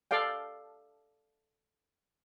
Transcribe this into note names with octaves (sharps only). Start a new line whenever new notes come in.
A4 D5 F5 G5